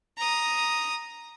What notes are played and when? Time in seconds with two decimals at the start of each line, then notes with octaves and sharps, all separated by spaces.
0.18 A#5 D#6